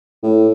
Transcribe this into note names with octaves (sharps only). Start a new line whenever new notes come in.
A2